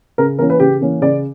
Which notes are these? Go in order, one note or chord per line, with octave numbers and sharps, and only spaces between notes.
C#3 A#4
E3 A#3 C#4 A#4
B4
C#3 G4
E3 A#3 C#4
C#3 D5